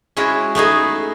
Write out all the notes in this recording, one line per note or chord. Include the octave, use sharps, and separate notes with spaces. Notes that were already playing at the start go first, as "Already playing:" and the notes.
G#3 C#4 E4 F#4
A3 B3 D#4 G#4